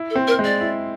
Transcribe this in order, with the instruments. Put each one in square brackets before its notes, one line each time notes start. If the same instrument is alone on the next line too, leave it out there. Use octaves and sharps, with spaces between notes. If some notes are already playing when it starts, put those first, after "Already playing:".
Already playing: [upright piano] E4
[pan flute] A4
[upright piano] C4
[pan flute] A#4
[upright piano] G#3
[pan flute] D5
[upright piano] E4